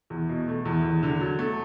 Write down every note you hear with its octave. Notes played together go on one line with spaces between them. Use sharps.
E2
B2
A3
E2
E2
D3
F#3
A3